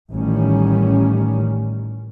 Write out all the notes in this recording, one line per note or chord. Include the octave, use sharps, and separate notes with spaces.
A1 A2 D#3 G3 C#4